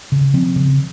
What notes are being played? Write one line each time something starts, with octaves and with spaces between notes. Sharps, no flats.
C#3
F3 C4
C#3